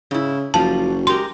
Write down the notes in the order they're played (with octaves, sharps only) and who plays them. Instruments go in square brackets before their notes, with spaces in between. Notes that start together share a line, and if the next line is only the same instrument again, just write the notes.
[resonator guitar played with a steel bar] G#2 E4 [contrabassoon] C#3
[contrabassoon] F#1 [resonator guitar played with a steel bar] F3 G3 F4 [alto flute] F#4 [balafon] A5
[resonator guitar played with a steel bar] G#3 G4 A#4 [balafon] C6